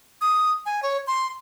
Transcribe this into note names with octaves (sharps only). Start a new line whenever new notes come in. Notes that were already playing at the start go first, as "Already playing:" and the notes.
D#6
G#5
C#5
C6